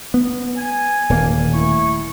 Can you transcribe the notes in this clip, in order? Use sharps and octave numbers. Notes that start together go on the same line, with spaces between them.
B3
G#5
D#1 D2 A#3
A3 E4 C#6